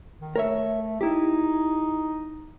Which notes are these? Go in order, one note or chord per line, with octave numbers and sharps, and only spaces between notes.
D#3
A3 A#4 C#5 E5
D#4 E4 G4